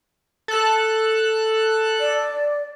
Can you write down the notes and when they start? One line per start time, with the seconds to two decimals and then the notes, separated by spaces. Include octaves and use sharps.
0.48 A4 F#6
2.00 D5